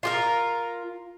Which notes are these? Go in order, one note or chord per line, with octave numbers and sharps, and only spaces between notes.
F4 G4 A#4